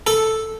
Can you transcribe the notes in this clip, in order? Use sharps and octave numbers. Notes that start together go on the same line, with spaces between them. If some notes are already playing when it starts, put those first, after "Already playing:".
A4